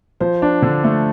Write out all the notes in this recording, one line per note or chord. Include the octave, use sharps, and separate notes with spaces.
F3 C5
D4
D3
A3